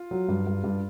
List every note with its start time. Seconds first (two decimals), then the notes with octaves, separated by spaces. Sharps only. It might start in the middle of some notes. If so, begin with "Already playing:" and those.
Already playing: F4
0.11 F#3
0.28 G2
0.47 G2
0.64 G2